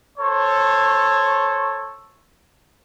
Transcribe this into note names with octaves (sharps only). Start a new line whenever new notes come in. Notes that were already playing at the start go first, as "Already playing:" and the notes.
A4 C5 C#5